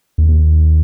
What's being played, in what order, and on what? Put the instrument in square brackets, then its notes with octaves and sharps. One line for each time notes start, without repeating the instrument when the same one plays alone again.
[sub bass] D#2